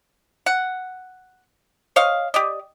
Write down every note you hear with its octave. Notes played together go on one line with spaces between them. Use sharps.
F#5
C5 C#5 D#5 F5
G4 D5 D#5